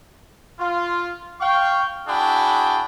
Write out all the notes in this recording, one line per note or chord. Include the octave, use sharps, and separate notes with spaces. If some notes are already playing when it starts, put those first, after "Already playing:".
F4
F5 G5 C#6
D4 E4 F#4 G#4 G5 B5